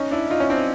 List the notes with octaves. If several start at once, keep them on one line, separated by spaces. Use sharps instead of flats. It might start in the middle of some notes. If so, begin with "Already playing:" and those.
Already playing: C#4 D#4
D4 E4
D#4 F4
C#4
C4 D4